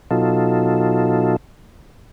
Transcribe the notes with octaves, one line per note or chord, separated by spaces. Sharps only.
B2 F#3 D#4 F4 A4